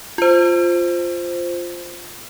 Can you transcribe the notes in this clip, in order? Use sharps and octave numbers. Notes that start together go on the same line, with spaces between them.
F4 C5